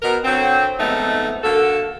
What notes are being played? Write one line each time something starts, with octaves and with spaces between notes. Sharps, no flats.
B2 A#4
D3 F#3 C4
F2 G#2 A3 B3 D#4
D3 A#3 F#4 A4